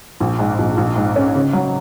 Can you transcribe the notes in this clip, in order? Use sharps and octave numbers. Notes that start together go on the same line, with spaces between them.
A#1
G#2
A#1
A#1
G#2
C#4
C#3
F#3